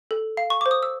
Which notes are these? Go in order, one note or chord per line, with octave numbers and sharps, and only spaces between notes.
A4
F5
C#6
C5 D6
D#6
E6